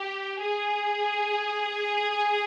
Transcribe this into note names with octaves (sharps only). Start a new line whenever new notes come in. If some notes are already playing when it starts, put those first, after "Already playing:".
Already playing: G4
G#4